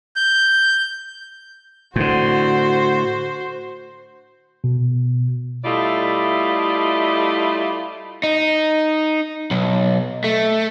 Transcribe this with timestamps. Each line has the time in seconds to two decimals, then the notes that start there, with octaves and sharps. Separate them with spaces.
0.16 G6
1.96 A2 D3 F#4 C5
4.64 B2
5.64 G3 A3 E4 F4 D5 D#5
8.23 D#4
9.51 B1
10.24 A3